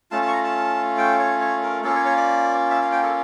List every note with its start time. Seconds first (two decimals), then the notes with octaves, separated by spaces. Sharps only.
0.11 A3 C#4 F4 A5
0.22 A5
0.28 C#6
0.33 A#5
0.44 A5
0.98 G5
1.19 C#5
1.40 C#5
1.63 A#4
1.83 A#3 C#4 F4 A4
1.95 C#5
2.06 C#5
2.17 D5
2.71 E5
2.81 F5
2.92 G5
3.03 A4